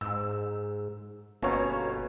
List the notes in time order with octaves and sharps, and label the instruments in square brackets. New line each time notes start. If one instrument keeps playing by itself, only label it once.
[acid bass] G#2 [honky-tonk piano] E6
[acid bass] G1 [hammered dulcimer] B2 C#4 [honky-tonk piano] A#3 C#5